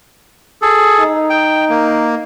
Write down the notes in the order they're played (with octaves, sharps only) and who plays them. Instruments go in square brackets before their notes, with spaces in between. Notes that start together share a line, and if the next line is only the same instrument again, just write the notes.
[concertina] G#4 A4
[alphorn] D#4
[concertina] G5
A#3